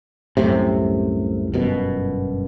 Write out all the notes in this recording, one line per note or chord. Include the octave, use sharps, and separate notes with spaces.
C2 F#2 A2 C3
G1 F#2 B2